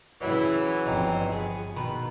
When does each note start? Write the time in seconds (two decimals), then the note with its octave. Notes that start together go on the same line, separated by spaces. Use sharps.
0.21 C#3 E3 F#3 E4
0.86 G1 F3 C4 D#4
1.32 B3 G#4
1.76 B2 D#3 B4